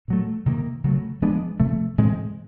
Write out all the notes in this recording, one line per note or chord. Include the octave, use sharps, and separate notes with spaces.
A#2 F#3 A3
C3 D#3 G3 A#3
C#3 F#3 A3
F3 G#3 B3 D4
C3 F3 A3
A2 E3 G#3 C4